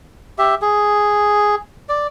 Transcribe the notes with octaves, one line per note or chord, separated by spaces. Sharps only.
G4 E5
G#4
D5